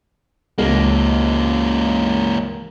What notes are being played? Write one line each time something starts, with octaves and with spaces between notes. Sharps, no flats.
C#2 E3 A#3